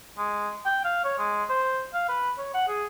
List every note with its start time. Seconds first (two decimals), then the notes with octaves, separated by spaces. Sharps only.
0.18 G#3
0.66 G5
0.85 F5
1.05 C#5
1.18 G#3
1.49 C5
1.94 F5
2.09 B4
2.38 C#5
2.54 F#5
2.68 G#4